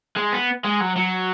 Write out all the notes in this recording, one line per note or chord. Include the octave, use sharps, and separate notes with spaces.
G#3
B3
G#3
F#3
F#3